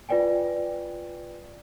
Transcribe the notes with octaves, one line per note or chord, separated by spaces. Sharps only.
F4 B4 D5 G5 G#5